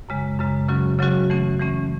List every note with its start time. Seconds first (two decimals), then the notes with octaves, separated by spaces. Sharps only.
0.09 F#2 C#3 G#3
0.39 F#2 C#3 G#3
0.69 C#3 F#3 C#4 F#4
0.99 C#3 F#3 C#4 F#4
1.30 E3 A3 C#4
1.60 E3 A3 C#4